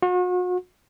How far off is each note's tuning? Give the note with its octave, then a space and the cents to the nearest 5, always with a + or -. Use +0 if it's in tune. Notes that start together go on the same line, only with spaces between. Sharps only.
F#4 -40